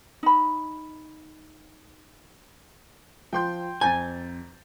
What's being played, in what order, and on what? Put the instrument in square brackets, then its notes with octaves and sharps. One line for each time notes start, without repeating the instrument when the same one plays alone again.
[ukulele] D#4 B5
[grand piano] F3 [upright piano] G5 C6 G6
[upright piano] F2 C4 [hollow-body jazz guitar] G#5 [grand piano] A#5 G6 A6